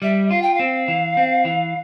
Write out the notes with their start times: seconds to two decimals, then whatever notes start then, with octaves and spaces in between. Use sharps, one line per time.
0.02 G3 E5
0.30 F4 F5
0.42 G5
0.54 F5
0.59 C4
0.88 E3
1.17 C4
1.45 E3